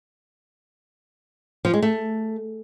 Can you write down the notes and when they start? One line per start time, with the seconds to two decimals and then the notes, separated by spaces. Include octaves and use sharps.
1.65 F3
1.74 G#3
1.82 A3